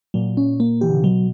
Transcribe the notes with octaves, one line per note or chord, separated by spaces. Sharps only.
A#2 F#3
C#4
A#3
E3 G4
D3
C#3
B2 F#3